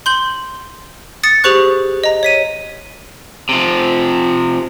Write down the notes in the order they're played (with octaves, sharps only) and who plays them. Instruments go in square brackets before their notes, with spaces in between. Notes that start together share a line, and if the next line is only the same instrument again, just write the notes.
[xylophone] C6 G6 F#7
D#6 A6 C#7
G4 G#4 C5 C#6 F#6
D#5 A#5
C#5 B6 D#7
[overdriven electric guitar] C3 F3